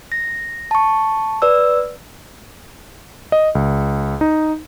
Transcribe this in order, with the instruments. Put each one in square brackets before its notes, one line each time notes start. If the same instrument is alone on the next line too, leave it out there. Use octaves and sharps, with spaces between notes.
[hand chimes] A#6
A5 C#6
B4 D5 E6
[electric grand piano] D#5
C#2
D#4